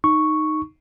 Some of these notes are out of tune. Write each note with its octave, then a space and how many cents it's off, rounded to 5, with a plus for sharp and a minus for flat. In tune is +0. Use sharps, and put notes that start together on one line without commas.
D#4 -5 C#6 +0